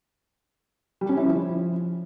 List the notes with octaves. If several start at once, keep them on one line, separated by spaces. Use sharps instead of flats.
G3
C#4
E4
F3